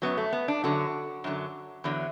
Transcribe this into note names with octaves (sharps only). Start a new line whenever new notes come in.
F#2 F#3 B3
A3
B3
D4
F#2 D3 F#3 F#4
F#2 D3 F#3
E2 D3 F#3